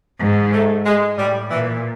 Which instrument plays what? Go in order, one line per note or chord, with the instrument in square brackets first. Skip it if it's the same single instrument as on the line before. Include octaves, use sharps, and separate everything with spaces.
[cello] G#2
[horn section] A3
G#3
[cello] A2 [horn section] G3
[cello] A#2 [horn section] E3